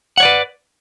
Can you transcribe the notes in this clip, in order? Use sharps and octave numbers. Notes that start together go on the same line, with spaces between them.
B4 C#5 D5 F#5